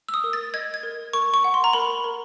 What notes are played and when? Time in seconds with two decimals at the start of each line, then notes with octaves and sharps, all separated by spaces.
0.09 E6
0.14 D#6
0.24 A#4
0.33 A6
0.54 D#5 G#6
0.74 G#6
0.83 A#4
1.13 A#4 C#6
1.34 C#6
1.44 F#5
1.54 C6
1.64 A#5
1.73 A#4 B5
2.04 A#4